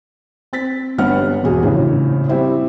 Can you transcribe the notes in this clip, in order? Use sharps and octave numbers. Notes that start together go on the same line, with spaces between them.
C4 A6 B6
G1 G2 B3 F#5 F6
E1 B2 F#4 G#4
A#1 A2 C#3
G3 C4 E4 C5